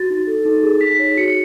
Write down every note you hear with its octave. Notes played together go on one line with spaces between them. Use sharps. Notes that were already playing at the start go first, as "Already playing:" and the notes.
Already playing: F#4 A6
D#4
A4
D#4
G#4
D#4 B6
C#5
F#4 C#7